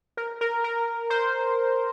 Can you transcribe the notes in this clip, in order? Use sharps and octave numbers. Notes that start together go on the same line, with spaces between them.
A#4
A#4
A#4
C5